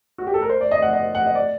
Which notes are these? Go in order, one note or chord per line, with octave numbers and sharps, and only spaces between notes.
F#4
G4
A4
A#4
C5
D5
D#5
F#5
D#5
F#5
D#5
D5